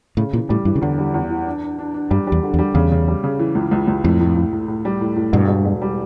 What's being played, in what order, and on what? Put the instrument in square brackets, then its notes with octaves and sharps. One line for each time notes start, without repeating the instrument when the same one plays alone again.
[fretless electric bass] A2 [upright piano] C#3
[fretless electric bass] A#2 [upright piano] E3
[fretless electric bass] A2 [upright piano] G3
[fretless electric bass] G2 [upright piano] E3
[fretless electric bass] C#3
[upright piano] E2 [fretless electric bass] D3
[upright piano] G3
E2
E3
D4
D4
D4
D4
[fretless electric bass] G2 [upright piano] G3
[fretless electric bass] E2 [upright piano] G3
[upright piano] D3
[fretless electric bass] E2
[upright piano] G3
[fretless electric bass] E2 [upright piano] C#3
[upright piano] C#3
G3
C#3
E3
C#2
C#2
C#2
[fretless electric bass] F2 [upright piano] A2
[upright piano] A2
A2
A2
A2
G3
A2
A2
[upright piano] E1 [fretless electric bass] G2
[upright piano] E1
E1
G3